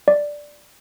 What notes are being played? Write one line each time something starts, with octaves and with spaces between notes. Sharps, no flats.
D5